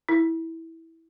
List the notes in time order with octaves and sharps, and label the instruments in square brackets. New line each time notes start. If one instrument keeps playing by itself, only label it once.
[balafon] E4